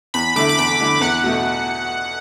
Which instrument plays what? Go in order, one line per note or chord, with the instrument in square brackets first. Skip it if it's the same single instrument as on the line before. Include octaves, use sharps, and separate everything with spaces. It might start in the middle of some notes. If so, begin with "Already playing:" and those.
[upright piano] E2 [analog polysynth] B5
[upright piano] D3 A3 E4 [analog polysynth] D6
[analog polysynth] D6
[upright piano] E2 [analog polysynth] B5
[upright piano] D3 A3 E4
[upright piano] E2 [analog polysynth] F#5
[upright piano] B2 A3 F#4